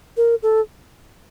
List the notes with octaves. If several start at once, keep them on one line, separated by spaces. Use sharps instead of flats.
A#4
A4